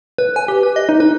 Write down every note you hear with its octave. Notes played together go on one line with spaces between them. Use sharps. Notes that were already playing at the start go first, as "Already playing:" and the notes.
B4
G#5
G4
B4
D#5
D#4
B4